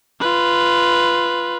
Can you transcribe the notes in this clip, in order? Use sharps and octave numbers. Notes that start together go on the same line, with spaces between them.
F4 B4